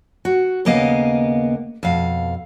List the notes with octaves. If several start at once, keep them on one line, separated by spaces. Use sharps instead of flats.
F#4
D#2 C#3 A#3 B3 D#5 F5
F2 B2 F5